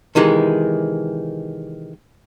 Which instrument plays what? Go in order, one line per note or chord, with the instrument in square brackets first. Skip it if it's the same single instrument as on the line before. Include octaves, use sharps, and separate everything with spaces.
[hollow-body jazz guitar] C3 D#3 E3 G#3